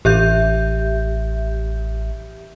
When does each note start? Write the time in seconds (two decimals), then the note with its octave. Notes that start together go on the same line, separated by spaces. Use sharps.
0.05 A1 G4 E5 G6